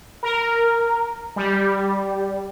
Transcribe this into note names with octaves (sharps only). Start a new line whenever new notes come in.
A#4
G3